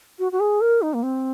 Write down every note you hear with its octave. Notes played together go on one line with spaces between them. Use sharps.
F#4
F#4
G#4
A#4
D#4
A#3
C4